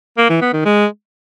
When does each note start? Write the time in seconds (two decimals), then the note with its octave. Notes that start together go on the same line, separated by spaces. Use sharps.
0.17 A#3
0.29 E3
0.41 B3
0.53 D#3
0.65 G#3